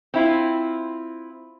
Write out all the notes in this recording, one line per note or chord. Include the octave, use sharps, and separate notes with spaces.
C4 E4 F4